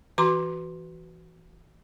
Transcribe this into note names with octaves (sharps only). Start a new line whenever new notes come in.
E3 F#4 A#5 C6 D6